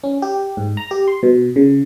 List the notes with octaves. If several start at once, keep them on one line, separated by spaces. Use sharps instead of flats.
C#4
G4
G#2
A#5
G4
C6
B2
C#3